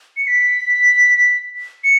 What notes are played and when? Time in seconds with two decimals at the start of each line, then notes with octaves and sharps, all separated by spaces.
0.17 C#7
0.27 B6
1.84 C#7